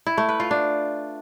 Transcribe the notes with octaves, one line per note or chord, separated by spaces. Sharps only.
E4
A3
B4
F4
D4